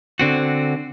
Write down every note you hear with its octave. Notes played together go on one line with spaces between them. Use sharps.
D3 C4 F#4